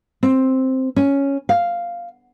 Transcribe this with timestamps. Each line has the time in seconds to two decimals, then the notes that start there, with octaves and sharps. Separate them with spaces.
0.23 C4
0.96 C#4
1.49 F5